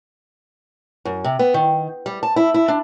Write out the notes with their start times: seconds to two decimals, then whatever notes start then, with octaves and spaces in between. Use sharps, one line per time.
1.05 F#2
1.24 C3
1.39 B3
1.54 D#3
2.06 G3
2.23 A5
2.36 E4
2.54 E4
2.68 D4